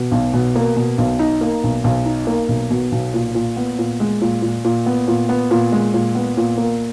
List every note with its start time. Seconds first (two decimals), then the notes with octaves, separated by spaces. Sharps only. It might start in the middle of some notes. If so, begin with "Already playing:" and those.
Already playing: B2
0.12 B1
0.33 B2
0.55 A#3
0.76 B2
0.98 B1
1.19 D#4
1.41 A#3
1.64 B1
1.84 B1
2.06 D#4
2.27 A#3
2.49 B1
2.71 B2
2.92 B1
3.14 A#2
3.35 A#2
3.57 B3
3.79 A#2
4.00 G#3
4.21 A#2
4.42 A#2
4.65 A#2
4.86 B3
5.08 A#2
5.29 B3
5.51 A#2
5.72 G#3
5.94 A#2
6.15 B3
6.37 A#2
6.58 A#3